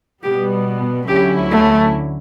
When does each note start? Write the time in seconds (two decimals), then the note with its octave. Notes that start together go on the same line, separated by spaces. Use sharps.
0.23 B2 G3 B3 G4
1.08 D2 D3 F#3 C#4 E4 G4
1.51 A3